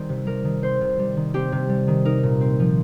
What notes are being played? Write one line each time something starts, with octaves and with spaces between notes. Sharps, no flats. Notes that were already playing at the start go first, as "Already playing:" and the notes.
Already playing: D#3 G3 C4
C3
G3 A#4
D#3
C4 C5
C3
G3
D#3
C4 G4
C3
G3
D#3
D#4 A#4
A#2
C4
F3